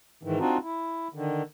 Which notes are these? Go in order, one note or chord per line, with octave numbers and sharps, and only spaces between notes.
G#2 D#3 E3
C4 D4 D#4 F4 F#4
E4
D3 D#3